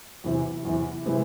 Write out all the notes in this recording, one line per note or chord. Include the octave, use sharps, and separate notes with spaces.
E2 C3 E3
E2 C3 E3
C3 E3 G#3 B3